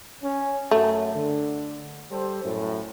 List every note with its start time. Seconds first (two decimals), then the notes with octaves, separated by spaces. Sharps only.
0.22 C#4
0.71 F#2 A3
1.14 D3
2.09 G3 A4 C5
2.44 F#2 A2